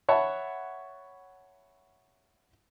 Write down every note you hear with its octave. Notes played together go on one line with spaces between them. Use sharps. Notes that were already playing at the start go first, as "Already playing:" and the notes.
C#5 E5 F#5 A5 B5